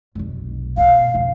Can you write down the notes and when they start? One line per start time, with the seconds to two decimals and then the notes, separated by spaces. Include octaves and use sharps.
0.15 F1 B1
0.77 B2 F5
1.14 F2 C#3